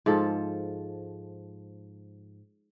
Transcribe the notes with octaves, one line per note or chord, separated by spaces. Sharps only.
G#2 F3 A4